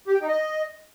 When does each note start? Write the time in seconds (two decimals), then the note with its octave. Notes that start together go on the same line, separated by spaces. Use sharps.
0.07 G4
0.14 G5
0.21 D#4
0.28 D#5